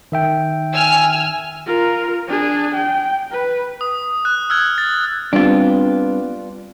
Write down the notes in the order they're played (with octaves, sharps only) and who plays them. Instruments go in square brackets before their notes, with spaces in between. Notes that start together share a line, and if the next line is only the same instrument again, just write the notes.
[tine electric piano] D#3 E5 G5
[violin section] G#5 E6 F6
[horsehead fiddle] F4 A#4
D4 G#4
G5
B4
[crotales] D#6
F#6
E6 F6 G#6
A6
[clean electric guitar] G3 B3 C4 [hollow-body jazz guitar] D4 F4